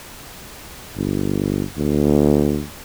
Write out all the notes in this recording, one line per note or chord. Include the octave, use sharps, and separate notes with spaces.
G1
D2